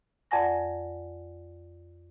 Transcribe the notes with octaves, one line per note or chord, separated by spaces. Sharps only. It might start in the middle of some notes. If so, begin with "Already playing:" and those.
F2 D5 F#5 G#5 A#6